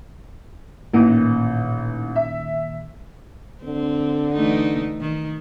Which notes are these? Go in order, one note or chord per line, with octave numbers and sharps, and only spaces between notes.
A1 A#2 D#3 E3
E5
D3 C4
E3 A3 D#4
D#3